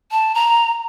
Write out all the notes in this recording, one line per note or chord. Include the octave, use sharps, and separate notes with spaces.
A5
A#5